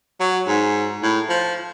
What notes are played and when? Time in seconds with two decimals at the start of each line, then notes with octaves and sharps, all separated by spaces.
0.20 F#3
0.47 G#2
1.02 A2
1.29 F3